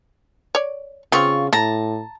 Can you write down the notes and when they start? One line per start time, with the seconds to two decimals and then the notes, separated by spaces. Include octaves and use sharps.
0.55 C#5 D5
1.12 C#3 B3 C4 F4 F5 C#6
1.53 A2 E4 A5 A#5